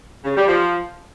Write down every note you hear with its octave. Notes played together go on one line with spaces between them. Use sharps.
C#3
G3
F3